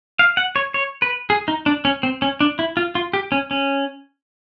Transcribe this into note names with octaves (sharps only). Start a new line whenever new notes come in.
F5
F#5
C#5
C#5
B4
G#4
D#4
D4
C#4
C4
C#4
D4
E4
F4
F4
G4
C#4
C#4